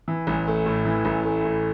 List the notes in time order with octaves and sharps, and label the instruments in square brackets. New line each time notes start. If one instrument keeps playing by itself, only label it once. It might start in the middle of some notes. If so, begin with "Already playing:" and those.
[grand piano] E3
A1
A3
A2
E3
A1
A3
A2